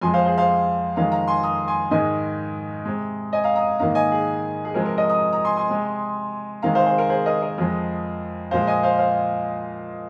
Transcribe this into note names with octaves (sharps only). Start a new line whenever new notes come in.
F2 F3 G#3 G#5 C6
C5 F5
G#4 C5
C5 F5
F2 D#3 G#3 F5 A#5
F5 A#5
G#5 C6
A#5 D#6
G#5 C6
G#2 D#3 G#3 D#5 G#5
C3 G#3
D#5 G#5
F5 A#5
A#5 D#6
G#2 D#3 A#3 F5 A#5
D#5 G#5
G#4
G#4
C3 F3 G#3 A#4
A#4
A#4 D#5
A#5 D#6
A#5 D#6
G#5 C6
G#5 C6
C3 G#3
C3 D#3 G#3 F5 A#5
C5 F5
G#4 C5
A#4
G#4 C5
A#4 D#5
A#4 D#5
F2 F3 G#3
A#2 F3 G#3 C5 F5
D#5 G#5
C5 F5
C5 F5